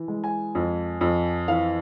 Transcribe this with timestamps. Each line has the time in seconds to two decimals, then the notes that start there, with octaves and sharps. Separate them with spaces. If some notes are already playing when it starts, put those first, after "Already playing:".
Already playing: E3
0.08 G#3
0.24 G#5
0.55 F2
1.01 F2
1.48 E3 F5